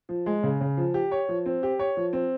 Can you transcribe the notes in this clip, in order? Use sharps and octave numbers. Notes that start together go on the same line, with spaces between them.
F3
G#3
C#3
C#3
F3
G4
C#5
F3
C4
G4
C#5
F3
C4